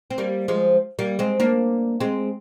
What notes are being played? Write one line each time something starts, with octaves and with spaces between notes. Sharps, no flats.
C4
G3 A#3
F3 G#3
G3 A#3
G#3 C4
A#3 D4
G#3 C4